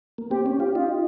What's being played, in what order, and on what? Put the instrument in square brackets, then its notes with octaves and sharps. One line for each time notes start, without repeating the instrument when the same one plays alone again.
[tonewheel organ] A#3
[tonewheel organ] C4 [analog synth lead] G4
[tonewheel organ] C#4
[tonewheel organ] F4 [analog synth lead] G4
[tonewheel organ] D#4 [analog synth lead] F4